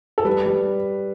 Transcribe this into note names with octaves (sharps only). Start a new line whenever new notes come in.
A4
G3 B4
G3